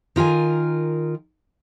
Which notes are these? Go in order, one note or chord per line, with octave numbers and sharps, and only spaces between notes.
D#3 F4 A#4 G#5